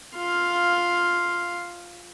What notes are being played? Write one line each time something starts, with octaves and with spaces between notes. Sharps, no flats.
F4 F5